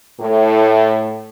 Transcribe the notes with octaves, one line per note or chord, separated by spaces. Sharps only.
A2